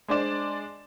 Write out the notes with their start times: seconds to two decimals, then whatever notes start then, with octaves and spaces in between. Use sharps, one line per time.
0.08 G#3 D4 C5 D5 E7